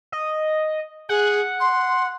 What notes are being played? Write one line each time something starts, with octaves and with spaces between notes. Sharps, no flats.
D#5
G#4 F#5
C6